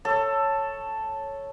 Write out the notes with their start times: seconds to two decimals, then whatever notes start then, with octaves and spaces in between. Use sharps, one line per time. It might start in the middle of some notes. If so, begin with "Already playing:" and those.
0.05 A4 C#5